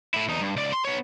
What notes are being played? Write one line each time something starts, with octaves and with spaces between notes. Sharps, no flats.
A2 E4
E2 D#4
G2
C#2 D5
C6
B3 C#5